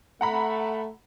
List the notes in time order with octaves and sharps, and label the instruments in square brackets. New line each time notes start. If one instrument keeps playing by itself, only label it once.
[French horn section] A3 [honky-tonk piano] F#5 A#5 B5